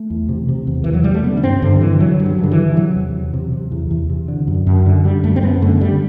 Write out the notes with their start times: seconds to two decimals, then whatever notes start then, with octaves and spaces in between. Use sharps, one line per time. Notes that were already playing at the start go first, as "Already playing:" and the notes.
Already playing: A3
0.10 E2
0.29 C3
0.48 C3
0.67 E2
0.84 E2 E3
0.94 F#3
1.04 C3 G3
1.14 A3
1.24 D3 B3
1.37 D4
1.43 G2 C4
1.62 G2 D3
1.81 D3 E3
2.00 D3 F#3
2.19 G2
2.26 F#3
2.39 G2 D3
2.52 E3
2.57 D3
2.76 C3 F#3
2.95 E2
3.14 E2
3.33 C3
3.53 C3
3.71 E2
3.91 E2
4.10 C3
4.28 D3
4.48 F#2
4.67 F#2
4.86 D3
5.04 D3 G3
5.24 F#2 A3
5.36 C4
5.42 F#2 B3
5.62 D3 A3
5.81 D3 G3